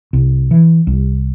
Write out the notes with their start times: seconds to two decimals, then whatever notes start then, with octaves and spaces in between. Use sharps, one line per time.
0.13 C2
0.51 E3
0.87 C2